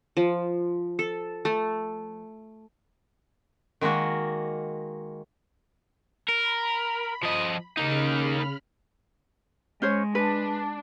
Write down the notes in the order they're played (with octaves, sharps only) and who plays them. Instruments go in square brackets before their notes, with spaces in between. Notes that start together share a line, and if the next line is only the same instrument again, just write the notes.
[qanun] F3
A4
A3
[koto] D#3 G#3 A#3 F#4
[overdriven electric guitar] A#4 [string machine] B5
[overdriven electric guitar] F3 D#5
[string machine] C#3 B5 F6 [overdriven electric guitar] A#3 D#4
[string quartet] G#3 [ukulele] C#4 C5 C#5
[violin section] D4 [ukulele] B4